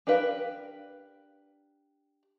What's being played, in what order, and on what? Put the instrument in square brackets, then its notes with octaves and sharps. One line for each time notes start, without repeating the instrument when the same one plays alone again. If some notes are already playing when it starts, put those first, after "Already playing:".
[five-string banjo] D4 G4 A#4 B4 F5